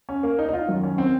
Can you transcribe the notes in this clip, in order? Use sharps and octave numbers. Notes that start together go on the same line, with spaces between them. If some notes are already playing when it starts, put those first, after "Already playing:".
C#4
A#3
D#4
D#4
F4
F#2 D#3 F#3
C#4
C4